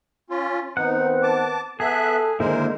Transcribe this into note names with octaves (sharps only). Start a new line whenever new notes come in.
C#4 F4
D#3 B3 C4 D#4 F#5
A5 D6
B3 G#4 A4 E5 F#6
D3 D#3 G#3 A#3 E4 A#4 C5